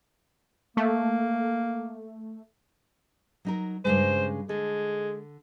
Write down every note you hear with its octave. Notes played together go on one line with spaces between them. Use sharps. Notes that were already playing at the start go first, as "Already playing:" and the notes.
A3 A#3
F#3 D#4 A#4
G2 C#3 G#3 C5
D3 G#3 A4